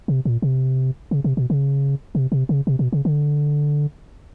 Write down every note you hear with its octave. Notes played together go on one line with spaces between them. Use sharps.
C3
A#2
C3
C#3
C3
B2
C#3
C3
C3
C#3
C3
B2
C#3
D3